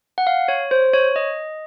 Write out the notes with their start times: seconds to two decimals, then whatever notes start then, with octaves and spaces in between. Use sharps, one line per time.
0.18 F#5
0.27 F5
0.48 C#5
0.71 C5
0.93 C#5
1.16 D#5